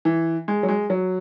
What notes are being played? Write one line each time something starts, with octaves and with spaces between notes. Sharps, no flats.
E3
G#3
F#3
G#3
F#3